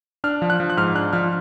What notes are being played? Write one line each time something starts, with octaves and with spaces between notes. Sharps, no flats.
D4 F6
F3
F#6
F3
F#6
G#2 F6
D4 F#6
F3 F6